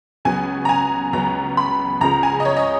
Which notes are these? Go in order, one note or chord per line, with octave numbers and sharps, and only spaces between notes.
C#2 C#3 F#3 B3 G#5
A#5
G#5
C#2 C#3 F#3 B3 A#5
B5
C#2 C#3 F3 G#3 A#5
G#5
D#5
C#5
D#5